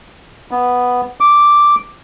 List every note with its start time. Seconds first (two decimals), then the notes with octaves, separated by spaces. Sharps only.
0.51 B3
1.20 D6